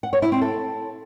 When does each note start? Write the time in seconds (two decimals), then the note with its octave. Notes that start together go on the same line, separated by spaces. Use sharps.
0.03 F#5
0.13 C#5
0.22 E4
0.32 C4
0.41 A4